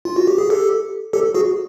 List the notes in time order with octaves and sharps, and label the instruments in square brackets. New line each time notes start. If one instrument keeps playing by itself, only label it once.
[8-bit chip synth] F4
F#4
G4
G#4
G4 A4
G4 A4
F#4 G#4